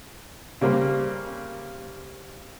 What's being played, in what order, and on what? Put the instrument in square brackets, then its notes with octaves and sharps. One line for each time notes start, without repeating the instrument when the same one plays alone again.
[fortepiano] C#3 G3 A#3 C4